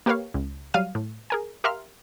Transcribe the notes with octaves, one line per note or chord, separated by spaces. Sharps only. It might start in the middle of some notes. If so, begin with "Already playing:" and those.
A#3 G4 A#4 B4 C#5 F5
C#2
F#3 G3 F5 F6 D#7
A2
G#4 A#4 G#5
G4 A#4 E5 F5 C6 F6